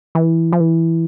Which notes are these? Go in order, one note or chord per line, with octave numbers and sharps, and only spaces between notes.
E3
F3
E3